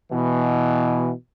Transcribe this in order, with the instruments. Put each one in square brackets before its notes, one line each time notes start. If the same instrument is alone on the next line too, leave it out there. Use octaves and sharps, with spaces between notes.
[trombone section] B2 E3